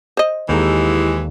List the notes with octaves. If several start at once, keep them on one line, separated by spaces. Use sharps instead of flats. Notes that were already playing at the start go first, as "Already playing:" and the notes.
C5 D#5
D#2 E3 G#3 E4 G4 A4 A#5